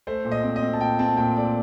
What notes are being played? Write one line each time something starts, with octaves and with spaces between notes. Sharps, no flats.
A3 C5
A#2
D#5
C4
D#5
C4
A5
A#2 G5
C4 A5
A#2 G5
A3 D5